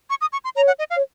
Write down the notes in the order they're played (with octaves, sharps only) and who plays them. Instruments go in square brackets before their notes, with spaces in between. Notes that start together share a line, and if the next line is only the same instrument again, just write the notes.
[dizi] C#6
D#6
C#6
C6
[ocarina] C#5 [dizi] A#5
[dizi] F#5
D#5
F5
[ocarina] C#5